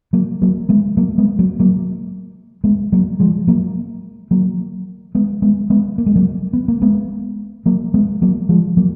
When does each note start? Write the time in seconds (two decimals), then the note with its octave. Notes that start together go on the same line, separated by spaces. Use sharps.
0.13 F#3 A#3
0.42 F#3 A#3
0.69 G#3 B3
0.97 F#3 A#3
1.18 G#3 B3
1.39 F#3 A#3
1.59 F#3 A#3
2.64 G#3 B3
2.92 F#3 A#3
3.20 F3 G#3
3.47 F#3 A#3
4.31 F#3 A#3
5.15 G#3 B3
5.42 G#3 B3
5.70 G#3 B3
5.98 A#3
6.06 G#3
6.16 F#3 A#3
6.53 B3
6.68 A#3
6.82 G#3 B3
7.66 F#3 A#3
7.94 G#3 B3
8.22 F#3 A#3
8.49 F3 G#3
8.77 F#3 A#3